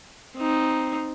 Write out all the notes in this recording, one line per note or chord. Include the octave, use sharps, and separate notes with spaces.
C4 D#4